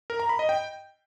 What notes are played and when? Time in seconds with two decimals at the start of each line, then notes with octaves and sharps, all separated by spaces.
0.10 A#4
0.20 A#5
0.29 B5
0.39 D#5
0.49 G5